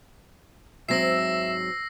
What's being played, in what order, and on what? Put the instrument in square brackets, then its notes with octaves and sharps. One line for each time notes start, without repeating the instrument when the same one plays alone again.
[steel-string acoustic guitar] G#2 F#3 C4 [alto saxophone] E5 [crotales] E6 A#6 C7